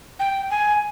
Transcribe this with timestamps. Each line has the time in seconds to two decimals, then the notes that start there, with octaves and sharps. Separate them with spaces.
0.19 G5
0.50 G#5